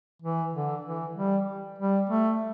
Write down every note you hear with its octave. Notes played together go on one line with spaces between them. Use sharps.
E3
D3
E3
G3
G3
A3